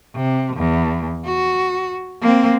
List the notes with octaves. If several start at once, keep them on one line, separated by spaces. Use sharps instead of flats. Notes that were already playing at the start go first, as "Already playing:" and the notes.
C3
E2
F#4
A#3 C4